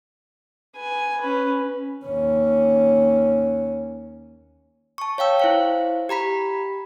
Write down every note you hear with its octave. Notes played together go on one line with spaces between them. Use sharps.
B4 G#5
C#4 B4
D#2 C#4
A5 C#6
C#5 F5 G5 E6
E4 C5 F5
G4 A#5 B5 B6